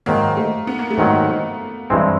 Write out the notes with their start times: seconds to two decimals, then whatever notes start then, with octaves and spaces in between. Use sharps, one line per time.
0.06 G#2 D#3 F#3 A#3
0.37 A3
0.67 B3
0.79 A#3
0.90 A3
0.98 G#2 D#3 F#3 A#3
1.90 G2 E3 G#3 C4